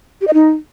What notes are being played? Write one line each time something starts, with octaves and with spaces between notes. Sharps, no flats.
G4
D#5
D#4